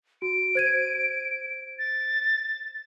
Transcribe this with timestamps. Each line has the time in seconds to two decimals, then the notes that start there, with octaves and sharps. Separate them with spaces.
0.22 F#4 D7
0.55 C5 G#6 D#7
1.79 A6